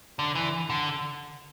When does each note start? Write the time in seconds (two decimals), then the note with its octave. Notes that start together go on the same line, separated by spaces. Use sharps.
0.19 D3
0.35 E3
0.70 D3